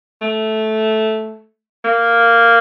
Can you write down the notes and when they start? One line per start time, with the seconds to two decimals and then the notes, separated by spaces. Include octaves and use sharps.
0.22 A3
1.85 A#3